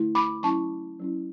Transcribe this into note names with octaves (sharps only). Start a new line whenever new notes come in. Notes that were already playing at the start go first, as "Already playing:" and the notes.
Already playing: D3 A3 E4
B5 D6
F#3 C#4 E4 A5 C#6
F#3 C#4 E4